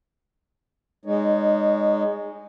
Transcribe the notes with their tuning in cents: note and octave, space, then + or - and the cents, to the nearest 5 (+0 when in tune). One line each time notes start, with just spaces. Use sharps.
G#3 -10 D#4 -20 C#5 +15